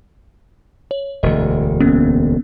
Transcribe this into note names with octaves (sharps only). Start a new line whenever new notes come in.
C#5
E1 D2 D#5
A#3 B3 C#4